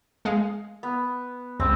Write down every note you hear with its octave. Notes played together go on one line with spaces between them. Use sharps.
G#3 G#4 F5
B3
C#2 C4